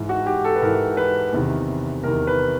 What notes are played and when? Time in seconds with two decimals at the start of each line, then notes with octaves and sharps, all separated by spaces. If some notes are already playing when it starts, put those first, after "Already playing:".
Already playing: G#2 E3
0.09 F#4
0.26 G4
0.44 A4
0.56 B4
0.62 G#2 E3 A#4
0.97 B4
1.33 E2 C3 D#3
2.03 E2 C3 D#3 A#4
2.27 B4